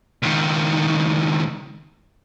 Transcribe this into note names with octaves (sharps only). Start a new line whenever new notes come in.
C#2 D#3